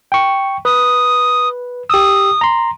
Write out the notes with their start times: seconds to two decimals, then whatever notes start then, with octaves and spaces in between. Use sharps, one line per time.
0.12 G5 C#6
0.65 B4 D#6
1.90 G4 D#6 E6
2.41 A#5 C6